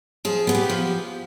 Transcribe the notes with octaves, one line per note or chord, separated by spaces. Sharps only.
F3 G#4
B3 G#4
G4
F3